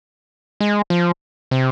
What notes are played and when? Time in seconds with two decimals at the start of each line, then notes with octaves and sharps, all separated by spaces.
0.61 G#3
0.90 F3
1.51 C3